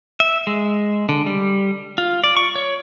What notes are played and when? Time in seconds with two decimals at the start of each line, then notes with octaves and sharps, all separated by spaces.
0.20 E5
0.47 G#3
1.09 D3
1.26 G3
1.98 F4
2.24 D5
2.37 C#6
2.56 C#5